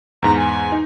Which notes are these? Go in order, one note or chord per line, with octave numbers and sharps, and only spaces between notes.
E2 G#2 A#5
G#5
D#4